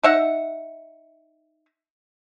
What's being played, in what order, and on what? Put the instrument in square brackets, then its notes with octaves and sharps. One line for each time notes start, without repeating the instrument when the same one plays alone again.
[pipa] D#4 E5 F#5